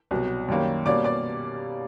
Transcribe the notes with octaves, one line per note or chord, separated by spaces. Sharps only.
C2 B2 F#3
F#2 D#3 G3 A#3 C#4
B2 G3 A#3 C#4 D5 D6
D5 D6